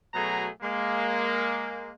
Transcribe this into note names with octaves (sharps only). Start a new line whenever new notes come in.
B2 F#3 A3 G#4 A#5
G#3 A#3